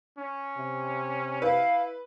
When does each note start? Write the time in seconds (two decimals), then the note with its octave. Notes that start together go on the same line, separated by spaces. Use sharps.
0.18 C#4
0.57 C3
1.42 E4 B4 F5